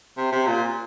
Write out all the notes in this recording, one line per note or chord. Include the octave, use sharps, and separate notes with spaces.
C3
C3
A#2